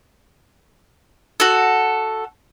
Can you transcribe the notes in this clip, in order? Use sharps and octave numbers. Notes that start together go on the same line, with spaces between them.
F#4 A4